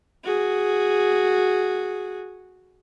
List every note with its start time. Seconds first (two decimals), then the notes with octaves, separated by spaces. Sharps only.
0.24 F#4 G#4